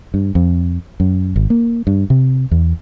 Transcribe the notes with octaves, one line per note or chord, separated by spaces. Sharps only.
G2
F2
F#2
G#1
A#3
G2
C3
E2